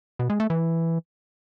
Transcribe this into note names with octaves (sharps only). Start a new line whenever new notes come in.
B2
G#3
A3
E3